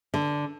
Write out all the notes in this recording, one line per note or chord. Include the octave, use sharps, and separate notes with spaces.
D3